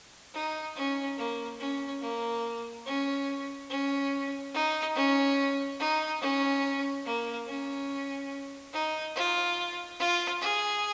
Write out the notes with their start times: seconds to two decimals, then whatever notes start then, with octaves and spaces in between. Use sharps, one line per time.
0.34 D#4
0.76 C#4
1.17 A#3
1.59 C#4
2.01 A#3
2.86 C#4
3.70 C#4
4.54 D#4
4.95 C#4
5.80 D#4
6.21 C#4
7.05 A#3
7.47 C#4
8.73 D#4
9.15 F4
9.99 F4
10.41 G#4